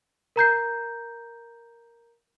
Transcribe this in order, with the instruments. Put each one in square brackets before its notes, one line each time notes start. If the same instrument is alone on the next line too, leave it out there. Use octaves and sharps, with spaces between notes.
[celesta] A#4 A#5 G6 C7